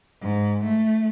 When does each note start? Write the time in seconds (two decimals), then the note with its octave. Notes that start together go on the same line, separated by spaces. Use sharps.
0.22 G#2
0.64 A3